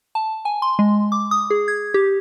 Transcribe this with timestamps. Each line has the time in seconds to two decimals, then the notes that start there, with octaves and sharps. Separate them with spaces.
0.15 A5
0.45 G#5
0.62 C6
0.79 G#3
1.12 D6
1.31 D#6
1.50 G#4
1.68 G#6
1.94 G4